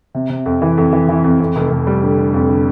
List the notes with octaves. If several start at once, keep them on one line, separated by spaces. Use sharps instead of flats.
C3
C3
F2
E3
F2
E3
E3
F2
F2
F1
F1
G3
D3
D3
F2
D3